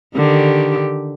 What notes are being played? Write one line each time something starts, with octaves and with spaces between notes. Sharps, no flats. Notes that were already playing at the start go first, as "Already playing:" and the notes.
D3 D#3 G4